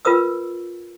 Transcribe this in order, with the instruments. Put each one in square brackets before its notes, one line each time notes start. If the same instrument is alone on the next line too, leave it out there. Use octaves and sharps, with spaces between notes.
[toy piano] F4 A#4 B4 D#6 E6